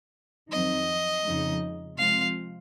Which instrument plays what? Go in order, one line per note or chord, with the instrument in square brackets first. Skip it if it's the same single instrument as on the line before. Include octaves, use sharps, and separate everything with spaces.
[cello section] F2 D#3 F#3 C4 D#4 [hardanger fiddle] D#5
[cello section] F2 C#3 F3 G#3 D#4
[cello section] C3 F3 G#3 C4 F4 [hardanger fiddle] F5